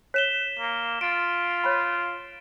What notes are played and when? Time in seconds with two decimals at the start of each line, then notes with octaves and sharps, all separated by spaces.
0.14 C#5 B6 E7 G7
0.59 A#3
1.01 F4 A6 D7
1.64 C#5 F5 B5